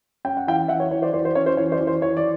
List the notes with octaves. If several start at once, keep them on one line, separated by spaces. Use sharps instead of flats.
C#4 G5
F#5
E3 F5 G5
E3 E5 F#5
C#5
E3 C#5
C5 D5
E3 C5 D5
C5
C#4 C#5
C5
E3 C#5
C5 D5
E3
C5
E3 C#5
D5